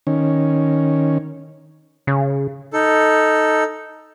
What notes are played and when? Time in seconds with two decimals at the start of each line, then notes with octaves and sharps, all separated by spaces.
0.07 D#3 C#4
2.07 C#3
2.72 D#4 A4